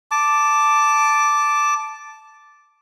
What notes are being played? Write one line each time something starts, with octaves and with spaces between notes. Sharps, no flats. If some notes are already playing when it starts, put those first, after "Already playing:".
A5 D6